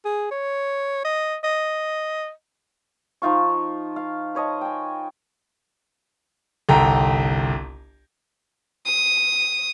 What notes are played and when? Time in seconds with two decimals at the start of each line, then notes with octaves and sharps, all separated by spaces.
0.05 G#4
0.31 C#5
1.05 D#5
1.44 D#5
3.22 F3 D#4 F4 C#6
3.96 F5
4.35 B4 C#5 D#5 A5
4.61 G5 G#5
6.69 G1 C2 A4 G5 A#5
8.86 D#6